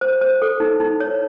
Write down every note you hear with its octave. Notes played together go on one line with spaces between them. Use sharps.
C5
C5
A4
D#4
D#4
C#5